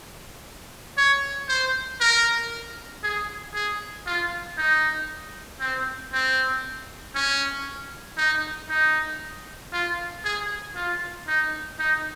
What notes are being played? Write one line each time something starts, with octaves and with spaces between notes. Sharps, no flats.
C#5
C5
A#4
G#4
G#4
F4
D#4
C4
C4
C#4
D#4
D#4
F4
G#4
F4
D#4
D#4